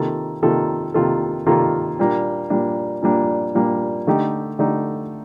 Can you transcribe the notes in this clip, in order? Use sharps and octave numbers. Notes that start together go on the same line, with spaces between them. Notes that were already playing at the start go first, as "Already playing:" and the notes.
Already playing: C3 D#3 A#3 F4 A4
C3 D#3 A#3 F4 A4
C3 D#3 A#3 F4 A4
C3 D#3 A#3 F4 A4
A#2 G3 A#3 D4
A#2 G3 A#3 D4
A#2 G3 A#3 D4
A#2 G3 A#3 D4
D3 A3 D#4 G4
D3 A3 D#4 G4